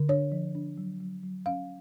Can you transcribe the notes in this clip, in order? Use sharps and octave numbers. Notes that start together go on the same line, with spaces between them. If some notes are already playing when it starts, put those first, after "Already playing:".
Already playing: D3
D4 C#5
F3
D4
F#3
F#3
F#3
C#4 F5